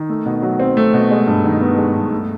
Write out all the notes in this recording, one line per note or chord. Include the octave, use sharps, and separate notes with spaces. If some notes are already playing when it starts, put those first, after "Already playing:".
Already playing: D#3
A3
B2
F#3
C4
A3
B2
G#3
G2
D#3
B3
G#3
G2
A3